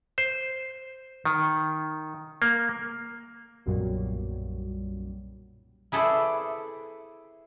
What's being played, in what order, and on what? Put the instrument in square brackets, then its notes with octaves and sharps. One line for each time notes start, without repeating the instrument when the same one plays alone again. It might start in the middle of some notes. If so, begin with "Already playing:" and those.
[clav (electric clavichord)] C5
D#3
A#3
[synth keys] B1 F#2 A#2 F#3 G3
[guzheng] E4 G#4 A4 B4 C5 D5